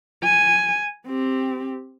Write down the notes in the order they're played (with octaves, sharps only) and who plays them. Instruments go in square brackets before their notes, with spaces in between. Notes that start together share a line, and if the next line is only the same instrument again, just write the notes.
[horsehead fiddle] G#5
C4 G4